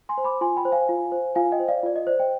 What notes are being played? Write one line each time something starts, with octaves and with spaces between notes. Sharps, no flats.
G#5 C6
C5
B5 D6
F4 G#5 C6
G5 B5
C5
F5 G#5
F4
C5
F4 F5 G#5
D#5 G5
C5
D5 F5
F4 D5
D#5
C5 D5
D#5 G5